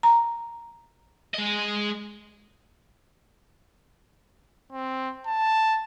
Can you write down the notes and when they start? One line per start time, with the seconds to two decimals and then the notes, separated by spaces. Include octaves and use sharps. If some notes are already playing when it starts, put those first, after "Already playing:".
0.03 A#5
1.34 G#3 D#5
4.72 C4
5.26 A5